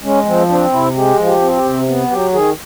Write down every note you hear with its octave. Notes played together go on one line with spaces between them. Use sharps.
G#3 C#4
F3 C4
C4 D4
C3 E4
G#3 G4
F3
G4
C4
G4
C3
B3
F#3 G4
D#3 G#4